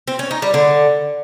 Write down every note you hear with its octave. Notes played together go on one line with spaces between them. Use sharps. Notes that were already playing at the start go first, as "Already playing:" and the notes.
C4
C#4
D#4
G3
D3